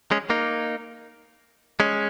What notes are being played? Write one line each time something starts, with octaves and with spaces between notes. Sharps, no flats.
G#3 C#4
A#3 D#4
G#3 C#4